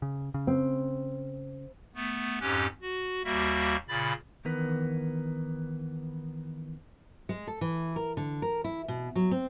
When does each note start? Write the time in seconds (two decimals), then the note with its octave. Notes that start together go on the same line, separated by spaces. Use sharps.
0.02 C#3
0.34 C#3
0.47 C4
1.95 A3 B3
2.41 F2 G#2 C#4 G4 F#6
2.82 F#4
3.25 D#2 G3 A#3 F#4 E5
3.88 A#2 C#3 B5 A6
4.45 D#3 E3 B3 A#4 B4
7.29 G#3
7.47 A4
7.61 E3
7.96 A#4
8.17 D3
8.42 A#4
8.64 E4
8.88 B2
9.16 F#3
9.31 C4